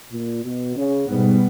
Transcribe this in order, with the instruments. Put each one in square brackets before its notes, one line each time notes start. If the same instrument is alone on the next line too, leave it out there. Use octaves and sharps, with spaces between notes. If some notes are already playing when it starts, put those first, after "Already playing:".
[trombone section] A#2
B2
C#3
[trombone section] G#2 [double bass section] B2 G3 B3